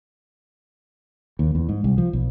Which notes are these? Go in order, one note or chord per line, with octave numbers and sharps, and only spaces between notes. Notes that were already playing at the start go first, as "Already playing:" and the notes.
D#2
E2
G#2
C2
F3
B1